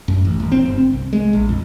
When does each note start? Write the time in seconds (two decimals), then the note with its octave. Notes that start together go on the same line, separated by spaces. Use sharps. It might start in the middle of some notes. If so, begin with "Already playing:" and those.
0.08 F#2
0.25 A1
0.40 D#1
0.52 C4
0.66 G1
0.78 C4
0.93 C2
1.13 G#3
1.33 A#1
1.49 F2